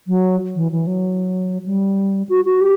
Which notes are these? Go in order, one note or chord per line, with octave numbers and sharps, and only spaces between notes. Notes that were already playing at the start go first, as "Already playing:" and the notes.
F#3
E3
E3
F#3
G3
F#4
F#4
G4